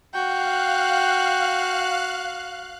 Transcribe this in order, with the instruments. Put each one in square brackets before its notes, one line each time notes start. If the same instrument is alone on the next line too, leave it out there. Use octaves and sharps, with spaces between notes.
[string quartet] F#4 [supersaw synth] F5 F#6 [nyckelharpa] G5